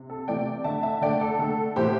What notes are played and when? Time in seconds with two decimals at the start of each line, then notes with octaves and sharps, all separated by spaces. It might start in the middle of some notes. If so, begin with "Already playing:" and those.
Already playing: C3
0.10 A4
0.28 C3 E3 A3 D5 G5
0.64 D3 A3 E5 A5
0.83 E5 A5
1.01 D3 A3 D5 G5
1.21 A4
1.39 D3 A3 A4
1.76 A2 E3 A3 G4 C5